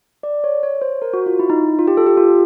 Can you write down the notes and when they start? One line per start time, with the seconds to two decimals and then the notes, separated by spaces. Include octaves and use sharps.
0.23 D5
0.44 C#5
0.63 C#5
0.82 C5
1.02 A#4
1.13 F#4
1.26 F4
1.39 E4
1.50 D#4
1.79 F4
1.87 G4
1.97 A4
2.07 G4
2.17 F4